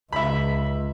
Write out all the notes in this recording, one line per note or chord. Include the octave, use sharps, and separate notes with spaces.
C#2 E5 B5